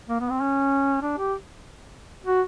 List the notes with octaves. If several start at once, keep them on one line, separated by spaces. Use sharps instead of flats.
A#3
B3
C4
C#4
D4
G4
F#4